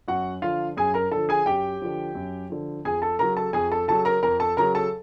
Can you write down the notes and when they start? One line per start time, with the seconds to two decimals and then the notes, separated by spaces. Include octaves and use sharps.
0.08 F#2 F#4 F#5
0.42 D3 F3 F4 F5
0.77 F#2 G#4 G#5
0.94 A#4 A#5
1.11 D3 F3 A4 A5
1.29 G#4 G#5
1.46 F#2 G4 G5
1.82 D3 F3
2.15 F#2
2.50 D3 F3
2.85 F2 G#4 G#5
3.02 A4 A5
3.19 C#3 F#3 A#4 A#5
3.37 A4 A5
3.53 F2 G#4 G#5
3.72 A4 A5
3.88 C#3 F#3 A4 A5
4.05 A#4 A#5
4.23 F2 A#4 A#5
4.40 A4 A5
4.57 C#3 F#3 A#4 A#5
4.75 A4 A5